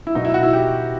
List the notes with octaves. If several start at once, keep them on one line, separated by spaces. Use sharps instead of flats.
E4
B2 F#3 D#4
E4
F#4
E4
G4